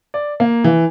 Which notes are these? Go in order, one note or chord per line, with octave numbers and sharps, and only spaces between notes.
D5
A#3
E3